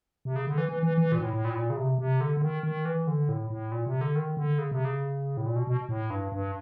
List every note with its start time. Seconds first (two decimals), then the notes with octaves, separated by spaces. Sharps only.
0.25 C3
0.36 C#3
0.47 D3
0.58 E3
0.69 E3
0.83 E3
0.98 E3
1.12 A#2
1.18 G#2
1.23 A2
1.33 A2
1.45 A#2
1.50 A2
1.55 A#2
1.70 C#3
1.77 C3
1.99 C3
2.21 D3
2.37 D3
2.42 D#3
2.63 D#3
2.85 E3
3.07 D3
3.29 A2
3.50 A2
3.72 A#2
3.86 C3
4.01 D3
4.15 D#3
4.37 D3
4.58 C#3
4.71 C3
4.85 C#3
5.37 A2
5.46 A#2
5.56 B2
5.67 B2
5.89 A2
6.10 G2
6.32 G2